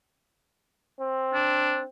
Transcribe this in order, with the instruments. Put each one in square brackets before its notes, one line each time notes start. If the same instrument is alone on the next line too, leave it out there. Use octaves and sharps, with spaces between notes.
[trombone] C4
[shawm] D4